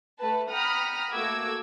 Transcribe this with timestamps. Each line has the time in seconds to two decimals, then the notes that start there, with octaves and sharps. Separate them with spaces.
0.18 A3 B4 A5
0.51 F#5 G5 A#5 B5 D#6 F6
1.11 A3 A#3 F#4 D6 E6 G#6